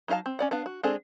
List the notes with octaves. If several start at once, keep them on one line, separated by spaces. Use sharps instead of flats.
F#3 D#4 F4 F5 A5
C4
C#4 D5 F#5
B3 D4 F5
F#4
G#3 C4 D4 G#4 A4